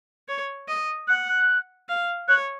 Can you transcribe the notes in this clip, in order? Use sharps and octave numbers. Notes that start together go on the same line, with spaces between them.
C#5
D#5
F#5 F#6
F#6
F5
C#5 F#6